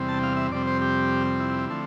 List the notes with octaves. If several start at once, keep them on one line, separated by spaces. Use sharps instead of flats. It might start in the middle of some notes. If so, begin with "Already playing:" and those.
Already playing: E2 C3 G3 C4
A5
F5
E5
F2 C3 G3 C4 D5
C5
G4
E4
D3 F3 A3 C4